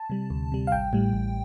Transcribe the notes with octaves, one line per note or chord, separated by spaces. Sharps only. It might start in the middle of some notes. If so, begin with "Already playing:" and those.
Already playing: A5
C3 G3
D2
C3 G3
F5
A1 G5
A2 G3
A1